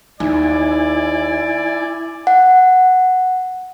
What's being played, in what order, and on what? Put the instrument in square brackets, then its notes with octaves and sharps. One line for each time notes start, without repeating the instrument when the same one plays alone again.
[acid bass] D#2 [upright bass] D#4 [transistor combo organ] E4 G#5 [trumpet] D5
[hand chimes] F#5